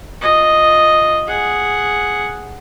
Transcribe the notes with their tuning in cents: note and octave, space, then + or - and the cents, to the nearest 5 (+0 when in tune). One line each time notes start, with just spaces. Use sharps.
F4 +0 D#5 +0
G#4 +0 F#5 +0